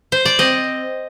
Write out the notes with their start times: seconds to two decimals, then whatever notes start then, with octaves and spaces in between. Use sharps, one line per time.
0.12 C5
0.25 D5
0.39 C4 D#5